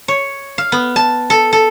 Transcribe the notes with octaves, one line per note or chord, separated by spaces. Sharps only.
C#5
F5
B3
A5
A4
A4